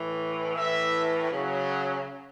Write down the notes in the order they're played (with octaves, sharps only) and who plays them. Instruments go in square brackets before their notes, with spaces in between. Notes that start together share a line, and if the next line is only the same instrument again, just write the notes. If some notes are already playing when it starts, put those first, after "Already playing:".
Already playing: [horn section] A2 E3
A2 E3 E5
C#3 F#3